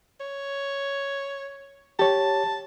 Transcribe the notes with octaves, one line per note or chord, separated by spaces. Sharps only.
C#5
G4 C#5 A5